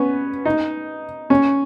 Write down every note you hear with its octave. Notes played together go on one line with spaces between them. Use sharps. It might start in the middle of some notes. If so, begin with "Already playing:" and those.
Already playing: B3 C#4
D#4
C#4